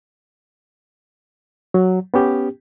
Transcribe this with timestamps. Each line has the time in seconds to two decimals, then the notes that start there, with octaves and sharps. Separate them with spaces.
1.74 F#3
2.14 B3 C#4 G4